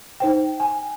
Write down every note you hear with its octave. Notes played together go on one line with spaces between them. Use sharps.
D#4 C5 G5
G5 G#5